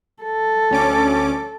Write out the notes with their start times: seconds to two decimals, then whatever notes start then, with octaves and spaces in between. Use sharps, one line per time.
0.23 A4
0.71 D2 C#4 D6